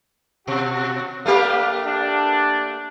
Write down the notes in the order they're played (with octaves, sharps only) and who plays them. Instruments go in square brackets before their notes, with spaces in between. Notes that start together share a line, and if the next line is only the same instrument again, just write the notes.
[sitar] B2 [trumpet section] F#4
[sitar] A3 A#3 G4 [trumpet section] D4 F5
[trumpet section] D4